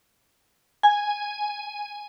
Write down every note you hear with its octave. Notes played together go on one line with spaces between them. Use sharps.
G#5